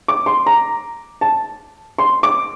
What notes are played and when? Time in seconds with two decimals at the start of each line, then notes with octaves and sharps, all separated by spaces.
0.08 D6
0.26 C6
0.46 A#5
1.21 A5
1.98 C6
2.23 D6